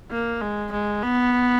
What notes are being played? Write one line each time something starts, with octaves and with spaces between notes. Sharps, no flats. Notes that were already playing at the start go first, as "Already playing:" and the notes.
A#3
G#3
G#3
B3